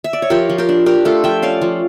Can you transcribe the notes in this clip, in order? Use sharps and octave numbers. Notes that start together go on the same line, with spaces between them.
E5
D5
C#5
F3 G4 A#4
F3
G4 A#4
D4
D4 G4 A#4
A3 F4 A4
F3 E5 G5
C#4 D5 F5
F3